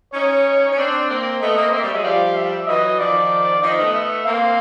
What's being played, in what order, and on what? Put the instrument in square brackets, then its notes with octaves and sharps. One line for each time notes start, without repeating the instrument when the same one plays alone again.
[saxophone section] C#4 D#4 [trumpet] C#5
[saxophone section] C#4
C4 D4
A#3 C4
[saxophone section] A3 B3 [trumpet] D#5
[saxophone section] A#3 C4
[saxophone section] A#3 C4 [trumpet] E5
[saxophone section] G3 A3
F#3 G#3
[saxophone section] F3 G3 [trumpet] F5
[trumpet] E5
[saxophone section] E3 F#3 [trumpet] D#5
[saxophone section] D#3 F3 [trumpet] D5
[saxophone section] D#3 F3 [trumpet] D#5
[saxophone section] A3 B3
[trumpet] E5
[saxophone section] A#3 C4 [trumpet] F5